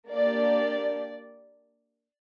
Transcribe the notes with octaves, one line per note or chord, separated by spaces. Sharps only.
A#3 D4 G4 D5